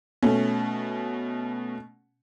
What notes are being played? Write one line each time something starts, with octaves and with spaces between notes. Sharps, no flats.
B2 A3 C#4